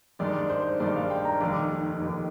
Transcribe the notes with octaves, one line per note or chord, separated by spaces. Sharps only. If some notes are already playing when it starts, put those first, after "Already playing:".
G#1 G2 D#3 G#3 D#4 D5
C5
G#1 G2 D#3 G#3 D#4 D5
F5
G5
A#5
F1 D#2 D#3 D6
F1 D#2 D#3